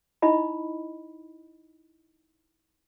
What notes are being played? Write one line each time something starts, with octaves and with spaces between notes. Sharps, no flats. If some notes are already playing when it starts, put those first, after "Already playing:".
D#4 E4 D#5 B5